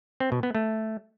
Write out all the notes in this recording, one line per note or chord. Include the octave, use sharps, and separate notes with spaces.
C4
B2
B3
A3